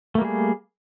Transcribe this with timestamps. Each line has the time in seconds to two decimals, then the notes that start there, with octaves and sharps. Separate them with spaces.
0.15 A3
0.18 A#3
0.21 G3
0.25 G#4